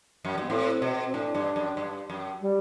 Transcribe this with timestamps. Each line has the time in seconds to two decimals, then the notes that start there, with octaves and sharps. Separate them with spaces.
0.25 F#2
0.38 G2 B3
0.50 A2 C4
0.82 B2
1.06 C4
1.14 A2 D4
1.35 G2
1.56 F#2
1.77 G2
2.10 F#2
2.41 G3